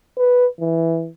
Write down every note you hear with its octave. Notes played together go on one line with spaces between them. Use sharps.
B4
E3